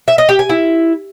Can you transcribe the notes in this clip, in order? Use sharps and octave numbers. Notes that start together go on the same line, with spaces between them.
E5
D#5
G4
G#5
E4